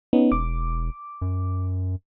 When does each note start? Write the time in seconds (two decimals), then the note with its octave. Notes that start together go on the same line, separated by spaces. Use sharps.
0.13 B3 C#4 D#4
0.32 E1 D6
1.22 F#2